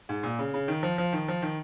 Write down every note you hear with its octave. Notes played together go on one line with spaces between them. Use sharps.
G#2
A#2
C#3
C#3
D#3
F3
F3
D#3
F3
D#3